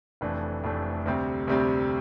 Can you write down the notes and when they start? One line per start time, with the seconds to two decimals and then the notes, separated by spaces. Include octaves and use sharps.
0.21 F1 F2 E3 A3 D4
0.64 F1 F2 E3 A3 D4
1.06 D2 C3 G3 C4
1.47 D2 C3 G3 C4